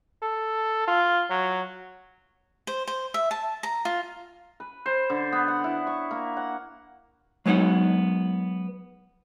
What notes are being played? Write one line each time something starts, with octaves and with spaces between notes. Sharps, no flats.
A4
F4
F#3
C5
C5
E5
A5
A#5
F4
B4
C5
D3
B3
F#5
E4
C#6
A#3
F#5
F#3 G#3 B3 D#4 F#5